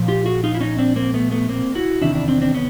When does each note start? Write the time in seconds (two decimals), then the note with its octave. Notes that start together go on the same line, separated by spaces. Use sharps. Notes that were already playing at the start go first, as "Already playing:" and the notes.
Already playing: A#2 F3
0.08 F4 G4
0.26 F#4 G#4
0.44 D#4 F4
0.55 E4
0.61 C#4 D#4
0.78 C4 D4
0.96 A#3 C4
1.14 A3 B3
1.31 A3 B3
1.49 A#3 C4
1.75 E4 F#4
2.02 E2 C3 D#3 D4 E4
2.15 D4 E4
2.28 C4 D4
2.41 C4 D4
2.54 B3 C#4